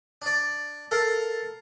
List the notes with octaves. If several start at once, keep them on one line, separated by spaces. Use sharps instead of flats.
D4 D5
A4 A#4 F5